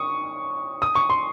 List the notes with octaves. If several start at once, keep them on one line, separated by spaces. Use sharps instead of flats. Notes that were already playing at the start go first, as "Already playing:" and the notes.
Already playing: C#6 D#6
D#6
C#6
C6